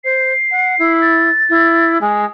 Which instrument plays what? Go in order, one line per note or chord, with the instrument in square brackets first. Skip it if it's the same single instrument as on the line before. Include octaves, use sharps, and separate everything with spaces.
[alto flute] C5 [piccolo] C7
[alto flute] F#5
E4
[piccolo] A6
[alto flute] E4
G#3